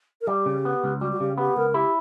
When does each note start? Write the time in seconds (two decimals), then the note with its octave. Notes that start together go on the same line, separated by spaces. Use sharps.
0.21 A#4
0.27 G3 G4
0.46 C#3
0.65 B3
0.84 C#2
1.01 G3 F#4
1.12 F#4
1.20 C#3 G4
1.38 B3 G4
1.56 C#2 A#4
1.74 E4 G4